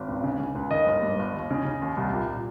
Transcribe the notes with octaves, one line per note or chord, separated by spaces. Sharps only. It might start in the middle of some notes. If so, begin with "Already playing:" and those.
Already playing: G#1
C#2
C#3
C#3
C#2
D#3 D#5
G1
G2
G1
D#2
C#3
C#3
D#2
C2
A#2
A#2